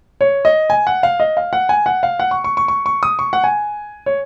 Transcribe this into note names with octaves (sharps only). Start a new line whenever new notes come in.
C#5
D#5
G#5
F#5
F5
D#5
F5
F#5
G#5
F#5
F5
F#5
C#6
C#6
C#6
C#6
C#6
D#6
C#6
F#5
G#5
C#5